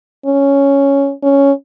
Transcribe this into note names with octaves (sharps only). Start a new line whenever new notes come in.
C#4
C#4